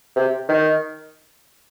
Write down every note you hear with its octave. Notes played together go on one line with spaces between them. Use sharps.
C3
D#3